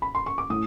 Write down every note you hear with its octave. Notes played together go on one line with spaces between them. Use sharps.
B5
C6
C#6
D6
A2 D#6